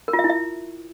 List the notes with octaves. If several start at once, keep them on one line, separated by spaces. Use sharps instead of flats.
A#4
F4
E5
E4
E5